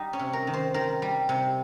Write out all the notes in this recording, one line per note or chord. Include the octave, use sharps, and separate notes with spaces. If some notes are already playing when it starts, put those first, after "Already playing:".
Already playing: G3 D#4
C#4
C3
A#4
D#3
C5
D#3 A#4
G3
C3